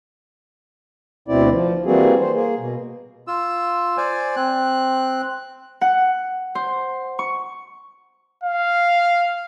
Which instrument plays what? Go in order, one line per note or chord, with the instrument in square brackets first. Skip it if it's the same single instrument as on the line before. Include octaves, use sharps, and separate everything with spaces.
[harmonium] D2 B2 C4 E4 D5
F3
E3 G3 A#3 C4 F#4 G#4
C5
A#3 G#4
B2
[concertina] F4 E6
C5 D5 G#5
C4 F#6
[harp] F#5
C5
C#6
[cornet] F5